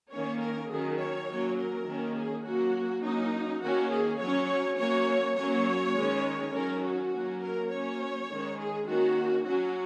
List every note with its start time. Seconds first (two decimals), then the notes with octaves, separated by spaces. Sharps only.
0.12 D#3 A#3 C#4 C#5
0.41 A#4
0.70 D#3 F#3 C#4 G#4
0.99 C#5
1.28 F#3 A#3 C#4
1.58 A#4
1.87 D#3 A#3 C#4
2.16 G#4
2.45 F#3 A#3 C#4 F#4
3.03 F#3 A#3 C#4 D#4
3.62 D#3 A#3 C#4 F#4
3.91 G#4
4.20 F#3 C#4 C#5
4.78 F#3 A#3 C#4 C#5
5.37 F#3 A#3 C#4 C#5
5.96 D#3 G#3 C#4
6.54 D#3 F#3 C#4 A#4
6.83 F#4
7.12 F#3 A#3 C#4
7.41 A#4
7.70 F#3 A#3 C#4 C#5
8.29 D#3 G#3 C#4
8.58 G#4
8.87 D#3 A#3 C#4 F#4
9.46 F#3 C#4 F#4